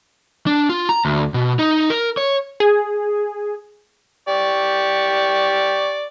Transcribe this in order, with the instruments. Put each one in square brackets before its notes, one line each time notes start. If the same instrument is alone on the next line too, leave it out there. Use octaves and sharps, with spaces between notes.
[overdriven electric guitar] D4
F4
A#5
D2
B2
D#4
A#4
C#5
[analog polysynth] G#4
[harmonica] G4 D5 C#6